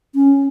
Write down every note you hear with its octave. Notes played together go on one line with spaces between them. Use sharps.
C#4